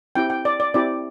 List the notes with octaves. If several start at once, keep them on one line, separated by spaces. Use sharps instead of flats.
C4 E4 G4 G5
G5
D5
D5
C4 E4 G4 D5